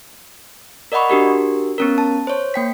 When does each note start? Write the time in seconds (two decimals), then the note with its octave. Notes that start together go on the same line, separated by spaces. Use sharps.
0.92 A#4 D5 D#5 F#5 B5 C#6
1.09 D4 F#4 G4 A#4
1.78 B3 C#4 A#4
1.98 A5
2.27 C5 C#5
2.54 A#3 G5 B6